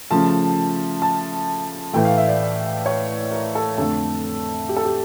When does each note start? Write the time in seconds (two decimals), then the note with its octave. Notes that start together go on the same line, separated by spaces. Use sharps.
0.11 C#3 F3 A3 A5
1.02 A5
1.93 A2 E3 A3 G5
2.05 F5
2.18 E5
2.28 D5
2.40 D5
2.86 C#5
3.31 A#4
3.55 A4
3.77 F2 D3 A3 A4
4.69 G4
4.76 A4
4.85 G4